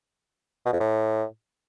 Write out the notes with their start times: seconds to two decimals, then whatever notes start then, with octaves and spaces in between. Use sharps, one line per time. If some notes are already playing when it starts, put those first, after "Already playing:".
0.65 B2
0.73 F2
0.80 A2